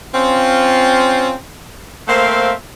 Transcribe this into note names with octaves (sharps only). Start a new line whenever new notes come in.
C4 C#4 F4
A3 A#3 C4 C5 E5 F5